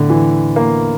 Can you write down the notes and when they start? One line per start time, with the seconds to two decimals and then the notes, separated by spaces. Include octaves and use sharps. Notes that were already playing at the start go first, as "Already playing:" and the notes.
Already playing: A2 D3
0.10 E3
0.56 A#3